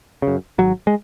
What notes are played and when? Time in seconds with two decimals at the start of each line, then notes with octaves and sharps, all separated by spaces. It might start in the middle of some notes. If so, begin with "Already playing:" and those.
0.22 F#2 C#3
0.58 G#1 F#3
0.87 G#3